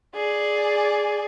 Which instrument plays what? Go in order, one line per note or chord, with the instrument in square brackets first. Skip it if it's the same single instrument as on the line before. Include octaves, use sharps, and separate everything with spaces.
[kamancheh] G#4 D5